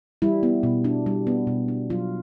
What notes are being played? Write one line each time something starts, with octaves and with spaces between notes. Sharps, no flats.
G3 E4
B3
B2
D4
G3
B3
B2
D4
F#3 F4